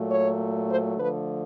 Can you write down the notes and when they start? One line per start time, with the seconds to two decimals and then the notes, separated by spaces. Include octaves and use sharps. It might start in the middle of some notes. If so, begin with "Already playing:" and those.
Already playing: A#2 F#3 A3
0.11 C#5
0.69 C5
0.98 D3 F3 A3 B4